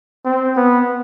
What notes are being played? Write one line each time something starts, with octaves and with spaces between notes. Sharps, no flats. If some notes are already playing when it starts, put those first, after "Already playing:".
C4
B3